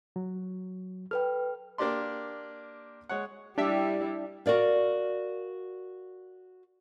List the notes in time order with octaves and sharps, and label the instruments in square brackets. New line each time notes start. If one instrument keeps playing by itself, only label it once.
[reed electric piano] F#3
[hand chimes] A4 B4 G5 [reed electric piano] F6
[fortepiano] A#3 D4 G4 D5 C6
G#3 C#5 F#5
[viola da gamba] G3 E4 [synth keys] D4 G4 E5
[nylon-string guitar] F#4 A#4 D5 F5